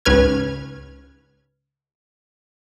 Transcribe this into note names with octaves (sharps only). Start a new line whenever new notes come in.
C#2 G#2 C#4 B4 F6 G#6